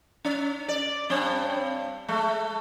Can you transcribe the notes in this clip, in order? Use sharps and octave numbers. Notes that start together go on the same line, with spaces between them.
C#4
D5
G2 C4
G#3 A3